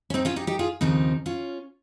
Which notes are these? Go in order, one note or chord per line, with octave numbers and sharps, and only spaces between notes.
C#4
C4 D#4
C#4 F4
D#4 G4
D#4 G4
F4 G#4
D#2 C#3 F3 C4 D#4
C#4 F4